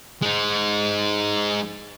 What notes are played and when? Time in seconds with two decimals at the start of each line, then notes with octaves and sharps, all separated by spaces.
0.22 G#3 D#4